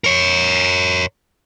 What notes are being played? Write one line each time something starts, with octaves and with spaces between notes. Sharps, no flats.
A#4 C#5